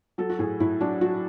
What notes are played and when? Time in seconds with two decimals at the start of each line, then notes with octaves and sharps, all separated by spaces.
0.18 F#3 A4
0.29 F#4
0.39 A2 G#4
0.60 A2 E4
0.81 F#3 D4
1.01 F#3 F#4